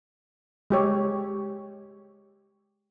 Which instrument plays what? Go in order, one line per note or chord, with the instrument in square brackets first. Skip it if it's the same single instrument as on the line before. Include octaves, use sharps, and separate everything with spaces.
[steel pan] G#3 G4 C#5